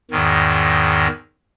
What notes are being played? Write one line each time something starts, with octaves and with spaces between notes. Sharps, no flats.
E2 G#2 D#3